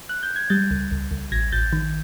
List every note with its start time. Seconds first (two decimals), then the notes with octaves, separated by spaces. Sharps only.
0.09 F#6
0.23 G6
0.36 G#6
0.50 G3 G6 A6
0.71 C#2
0.91 C#2
1.11 C#2
1.32 A1 G#6 A#6
1.52 A1 G6 A6
1.73 D#3